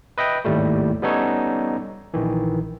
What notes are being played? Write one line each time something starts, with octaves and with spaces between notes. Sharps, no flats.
B4 D#5 E5 G5
G#1 D#2 A2 G3 A3
G3 B3 C#4 D#4 A4 C#5
A#1 D#3 E3